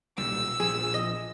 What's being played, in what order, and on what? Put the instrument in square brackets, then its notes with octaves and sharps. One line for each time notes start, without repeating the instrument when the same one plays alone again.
[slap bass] B1 A#2 G3 [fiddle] E6
[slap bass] A#1 F3 [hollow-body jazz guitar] G#4
[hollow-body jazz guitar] D#5